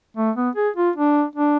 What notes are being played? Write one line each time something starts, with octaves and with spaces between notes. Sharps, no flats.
A3
B3
G#4
F4
D4
D4